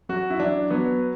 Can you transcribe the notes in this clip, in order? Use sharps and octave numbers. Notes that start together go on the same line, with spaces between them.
F#3 F#4
E4
F#3 D4
F#3 B3